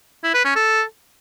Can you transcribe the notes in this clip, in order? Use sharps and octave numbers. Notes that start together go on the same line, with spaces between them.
E4
B4
C#4
A4